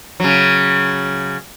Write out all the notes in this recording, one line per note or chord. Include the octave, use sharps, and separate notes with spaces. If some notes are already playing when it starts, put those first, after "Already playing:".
C#3 F#3